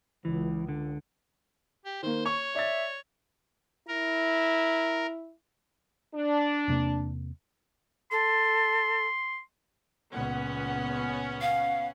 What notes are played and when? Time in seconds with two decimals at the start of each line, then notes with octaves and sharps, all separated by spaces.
0.25 C#2 E3
0.69 D3
1.85 G4
2.03 D#3 A#3 C5
2.26 C#5 C#6
2.55 D5 E5 A6
3.88 E4 A#4
6.14 D4
6.68 E2 C3 A#3
8.11 A4 C6
10.12 C#2 A#2 B3 C#4 F#5
11.41 F5